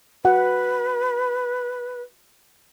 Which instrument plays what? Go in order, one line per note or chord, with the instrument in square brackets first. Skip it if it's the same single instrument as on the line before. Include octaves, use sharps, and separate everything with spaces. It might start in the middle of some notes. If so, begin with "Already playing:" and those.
[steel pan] F#4 F#5 [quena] B4